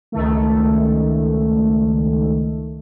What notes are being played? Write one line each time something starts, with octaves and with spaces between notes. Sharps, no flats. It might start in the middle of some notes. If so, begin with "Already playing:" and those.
C#2 D#3 A3